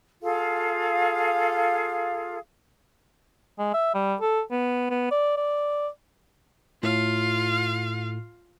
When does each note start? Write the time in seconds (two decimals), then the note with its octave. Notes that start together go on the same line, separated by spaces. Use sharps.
0.22 F4 G#4 A4 F5
3.59 G#3
3.74 E5
3.95 G3
4.21 A4
4.51 B3
4.90 B3
5.11 D5
5.37 D5
6.83 A2 F4 F5